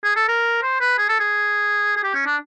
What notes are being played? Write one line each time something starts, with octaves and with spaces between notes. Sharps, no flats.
G#4
A4
A#4
C5
B4
G#4
A4
G#4
G#4
G4
C#4
D4